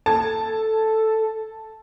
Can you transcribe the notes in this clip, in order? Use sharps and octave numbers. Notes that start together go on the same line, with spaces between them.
A4 A5 G#6